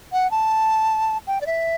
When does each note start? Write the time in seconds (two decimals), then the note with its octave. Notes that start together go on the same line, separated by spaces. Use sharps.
0.12 F#5
0.31 A5
1.27 G5
1.41 D5
1.47 E5